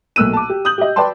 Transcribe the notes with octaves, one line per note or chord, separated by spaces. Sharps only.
B1 A3 A#3 E6 F#6 D#7
A5 D6
G4
D#6 G6 F#7
G4 D#5
B4 D5 G5 A5 C6